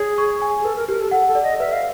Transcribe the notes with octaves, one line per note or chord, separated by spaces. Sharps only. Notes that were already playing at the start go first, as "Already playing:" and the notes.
Already playing: G#4 C#5
C#6
G#5
G#4
A4 B4
A#4
G4 A#4
A4
A4 F#5
A4
D5
D#5
B4 E5
F5